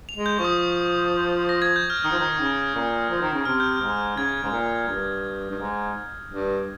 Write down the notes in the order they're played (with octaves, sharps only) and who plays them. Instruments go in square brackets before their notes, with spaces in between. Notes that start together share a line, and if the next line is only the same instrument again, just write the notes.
[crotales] F7
[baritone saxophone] G#3
[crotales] G6
[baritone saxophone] F3 [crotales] C#6
[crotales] D#6
A#6
G#6
G6
F6
[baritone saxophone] D#3 [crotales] D#6
[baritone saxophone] F3
D#3
C#3
A#2
F3
D#3
C#3
[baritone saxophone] C3 [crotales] F6
[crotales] G6
F6
[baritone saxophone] G#2
[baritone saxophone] C#3 [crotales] G#6
[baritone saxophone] G#2
A#2
G2
G2
G#2
G2